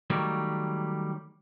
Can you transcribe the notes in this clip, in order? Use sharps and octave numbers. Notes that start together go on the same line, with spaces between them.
D#3 F#3 G3 A3 A#3